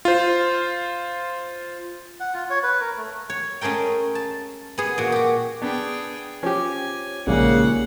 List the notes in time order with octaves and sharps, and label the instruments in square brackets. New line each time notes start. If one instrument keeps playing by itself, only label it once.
[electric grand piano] F4 C5
[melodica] F#5
F4
C#5
B4
A#4
A3
[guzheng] C#5
A3 C#4 G#4 A#4 G5
A5
B3 G#4
A#2 F#4
F#4 G4
[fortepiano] B3 D4 [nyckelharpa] G#4 G5
[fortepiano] F3 [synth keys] C#4 G4 [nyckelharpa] G#5
[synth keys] A#1 G#2 G3 [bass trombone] C#3 [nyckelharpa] A#3 F#5